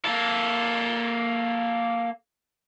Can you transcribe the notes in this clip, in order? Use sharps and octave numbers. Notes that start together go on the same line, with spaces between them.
A#3 A4